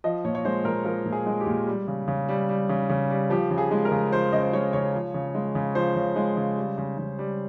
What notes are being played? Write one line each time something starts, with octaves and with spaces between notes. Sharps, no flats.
F3 D#5
A#2 C#5
C#5
G#3 C5
A#2 A#4
F3 A#4
A#2
G#4
G#3
G4
A#2
G3
C#3
C#3
G3
G3
C#3
C#3
G3
F3 G4
C#3
G#4
G#3
A#4
C#3
F3 C5
C#3 D#5
C5
G#3 C#5
C#3 C#5
F3
C#3
G#3
C#3
F3 C5
C#3
G#3
C#3
G3
C#3
C#3
G3